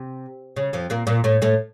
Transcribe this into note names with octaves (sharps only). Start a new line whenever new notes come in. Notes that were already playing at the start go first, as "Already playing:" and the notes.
Already playing: C3
C#3
F2 F3
A#2 A#3
A#2 A#3
A2 A3
A2 A3